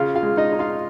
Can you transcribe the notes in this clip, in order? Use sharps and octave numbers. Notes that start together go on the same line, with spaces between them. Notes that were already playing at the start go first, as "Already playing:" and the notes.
Already playing: C#3 F4 F5
F4 F5
G#3
D#4 D#5
D#4
F4 F5